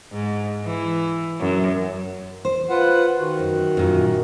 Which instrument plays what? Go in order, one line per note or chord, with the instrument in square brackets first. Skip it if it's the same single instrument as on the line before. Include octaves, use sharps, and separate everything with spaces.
[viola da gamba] G#2
E3
F#2
[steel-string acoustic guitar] C5
[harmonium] F4 B4 F#5
D#3 F#4
[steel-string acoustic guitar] F#2
F#2 A#2